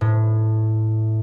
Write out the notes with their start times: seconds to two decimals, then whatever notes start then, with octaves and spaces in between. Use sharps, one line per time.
0.01 A2